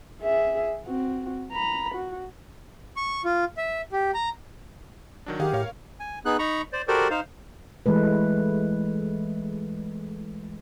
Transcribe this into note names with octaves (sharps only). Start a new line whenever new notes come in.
G#4 E5
C4 F#4
A#5 B5
F#4
C#6
F4
E5
G4
A#5
D#3 F#3 D4
D#3 G4 G#4 F5 F#5
A2 A#4 C#5 F5
G#5
B3 D#4 G#4 F#6
D#4 A#5 B5 C#6
C5 D5
F#4 G4 A4 A#4 C5 D5
D#4 C5 F5
E3 G#3 A3 B4